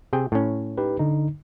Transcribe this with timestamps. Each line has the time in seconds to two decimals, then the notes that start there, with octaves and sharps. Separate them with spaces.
0.13 C3 G#4 G5
0.32 A2 C#4
0.78 D#4 G4 B4
0.99 D3 D#4